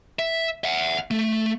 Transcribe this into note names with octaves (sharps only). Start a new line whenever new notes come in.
E5
E5 F#5
A3